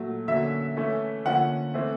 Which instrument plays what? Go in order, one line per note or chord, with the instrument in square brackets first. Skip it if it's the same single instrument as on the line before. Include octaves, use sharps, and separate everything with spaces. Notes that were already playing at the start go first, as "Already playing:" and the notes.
Already playing: [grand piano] A#2 F#3 A3
D3 F#3 A#3 C#4 E5
E3 A3 C#4
D3 F3 A#3 C#4 F#5
E3 A3 C4